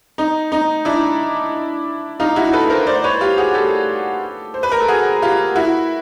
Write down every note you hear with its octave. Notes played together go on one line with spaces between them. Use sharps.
D#4
D#4
D4 E4
D#4 F4
E4 F#4
A4 B4
A#4 C5
C5 D5
B4 C#5
F4 G4
F#4 G#4
G4 A4
C5
B4
A#4
A4
F#4 G#4
F4 G4
E4 F#4